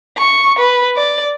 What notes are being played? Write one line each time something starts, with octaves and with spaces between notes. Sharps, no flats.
C#6
B4
D5